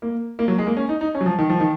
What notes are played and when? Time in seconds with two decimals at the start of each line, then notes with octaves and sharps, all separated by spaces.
0.02 A#3
0.39 A#3
0.48 F#3
0.58 G#3
0.67 A#3
0.77 C#4
0.89 D#4
1.01 D#4
1.15 C#4
1.21 F#3
1.26 F3
1.39 D#3
1.50 F3
1.60 D#3